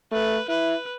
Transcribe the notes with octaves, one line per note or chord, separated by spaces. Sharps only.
A3 B4
E4 B4